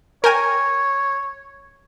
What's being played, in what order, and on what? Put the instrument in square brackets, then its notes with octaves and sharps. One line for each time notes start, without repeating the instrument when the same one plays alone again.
[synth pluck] A#4 G5 G#5 [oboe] C#5